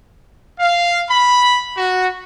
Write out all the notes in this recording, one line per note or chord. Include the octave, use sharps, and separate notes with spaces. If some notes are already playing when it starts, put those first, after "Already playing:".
F5
B5
F#4